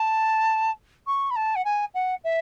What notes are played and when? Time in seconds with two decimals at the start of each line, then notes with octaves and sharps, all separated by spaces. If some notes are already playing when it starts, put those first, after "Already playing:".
Already playing: A5
1.07 C#6
1.30 B5
1.36 A5
1.55 F#5
1.65 G#5
1.94 F#5
2.24 E5